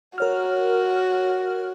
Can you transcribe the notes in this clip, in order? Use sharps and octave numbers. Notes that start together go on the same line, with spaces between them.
F#4 A#4 C#5 F6